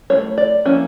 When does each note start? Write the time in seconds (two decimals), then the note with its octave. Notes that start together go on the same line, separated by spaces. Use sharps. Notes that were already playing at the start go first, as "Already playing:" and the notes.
0.10 A3 C#4 E4 C#5
0.38 D5
0.65 F3 A#3 C#4 E4